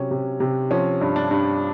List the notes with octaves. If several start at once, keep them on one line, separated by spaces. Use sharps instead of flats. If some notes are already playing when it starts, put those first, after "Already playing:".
Already playing: C3 F#3 C#4
C3
C3
F3 C#4
G2
D4
G2